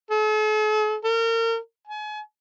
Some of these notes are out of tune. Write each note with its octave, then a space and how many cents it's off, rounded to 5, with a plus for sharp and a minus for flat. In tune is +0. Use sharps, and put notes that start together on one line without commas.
A4 -45
A#4 -35
G#5 +35